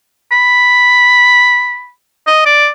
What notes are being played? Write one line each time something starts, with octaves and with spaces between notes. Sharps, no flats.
B5
D#5
D5